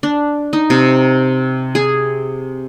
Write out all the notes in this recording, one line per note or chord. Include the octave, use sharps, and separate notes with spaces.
D4
D#4
C3
G#4